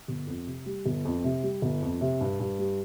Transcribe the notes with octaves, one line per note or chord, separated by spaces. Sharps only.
G1
F2
C3
G3
G1
F2
C3
G3
G1
F2
C3
G2
G2
G3